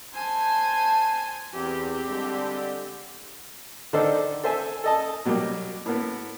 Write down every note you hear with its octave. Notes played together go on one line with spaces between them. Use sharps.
C5 G#5 A5
E2 C4 G4
D3 G3 G#3
D3 D#3 D4 D#4 A4 C5
A4 C5 E5 G#5
A4 D#5 A5
B2 F#3 G3 A#3 G4
A2 A#3 B3